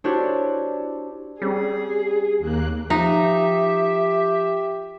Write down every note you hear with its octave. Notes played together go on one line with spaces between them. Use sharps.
D4 E4 F#4 G4 C5 C#5
G3 C4 C#4 G4 G#4
D#2 A#3 F#6
F3 D#4 G4 E5